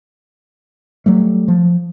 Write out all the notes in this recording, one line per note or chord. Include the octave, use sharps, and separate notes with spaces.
F#3 G3 A3
F3